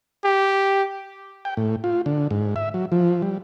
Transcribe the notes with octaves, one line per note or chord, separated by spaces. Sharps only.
G4
G5
A2
F4
D3
G#2
E5
F#3
F3
G3